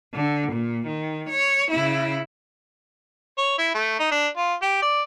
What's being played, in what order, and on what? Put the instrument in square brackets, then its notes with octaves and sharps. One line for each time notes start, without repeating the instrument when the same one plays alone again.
[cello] D3
A#2
D#3
C#5
C#3 E4
[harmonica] C#5
E4
A3
D#4
D4
F4
G4
D5